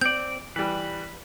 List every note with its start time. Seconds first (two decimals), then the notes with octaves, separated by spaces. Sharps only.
0.01 C4 D5 G6
0.56 E3 G3 B4